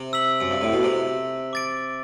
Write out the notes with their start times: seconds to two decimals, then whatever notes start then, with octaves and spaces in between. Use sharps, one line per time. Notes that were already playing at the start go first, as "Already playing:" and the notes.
Already playing: C3
0.13 E6 B6 F#7
0.41 F#2
0.51 G2
0.61 A2
0.73 B2
0.83 C3
1.53 D6 A6 D7